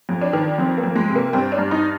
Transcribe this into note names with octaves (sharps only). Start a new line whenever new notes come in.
F2
D4
D#3
F2 C4
A#3
F2
G#3
C3
A#3
G2 C4
D4
G2
D#4